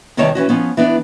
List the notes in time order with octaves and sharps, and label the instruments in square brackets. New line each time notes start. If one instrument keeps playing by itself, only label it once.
[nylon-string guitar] E2 C3 D#3 G3 C#5 A5
E3 C#4 F#4
F3 B3 C#4
E3 B3 D4